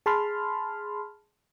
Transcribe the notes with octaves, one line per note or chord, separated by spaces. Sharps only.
G#4 A5 B5 C6 F6